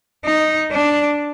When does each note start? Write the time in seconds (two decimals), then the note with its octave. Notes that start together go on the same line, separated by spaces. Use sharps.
0.25 D#4
0.72 D4